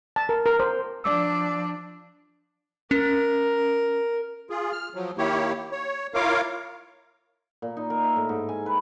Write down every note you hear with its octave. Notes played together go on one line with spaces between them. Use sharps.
A5
A#4
A#4
C5
F3 D4 D5 D6 E6
C#4 A#4
F4 G#4
F6
F3 F#3
D#3 A#3 E4 G4 C#5
C#5
E4 F4 A#4 C#5 F5 D6
A#2
D#4
A#4
E5
A2
G#2
G#5
B4